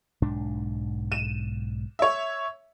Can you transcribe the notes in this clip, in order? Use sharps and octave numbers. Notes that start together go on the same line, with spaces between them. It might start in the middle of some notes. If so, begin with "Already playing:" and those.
B1 G#2 D4
D#7 E7
C#5 E5